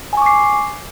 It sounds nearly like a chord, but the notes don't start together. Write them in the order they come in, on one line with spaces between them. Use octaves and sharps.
G#5 C#6 D6 C7